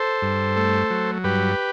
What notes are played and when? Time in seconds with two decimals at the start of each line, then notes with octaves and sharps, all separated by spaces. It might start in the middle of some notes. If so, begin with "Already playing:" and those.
Already playing: A4 C5
0.22 G2
0.57 A3
0.90 F#3
1.24 G2 G4 B4